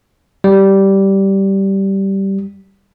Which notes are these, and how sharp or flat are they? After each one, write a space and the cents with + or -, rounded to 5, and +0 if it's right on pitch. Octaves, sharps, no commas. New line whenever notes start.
G3 -10